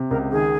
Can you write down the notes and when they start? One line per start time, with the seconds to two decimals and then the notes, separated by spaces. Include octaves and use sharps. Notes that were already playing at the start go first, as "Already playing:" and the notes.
Already playing: C3
0.11 C#2 A#4
0.32 D#3 G#4